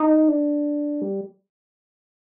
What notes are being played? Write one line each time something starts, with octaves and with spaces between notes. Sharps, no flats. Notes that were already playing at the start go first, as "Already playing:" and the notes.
Already playing: D#4
D4
G3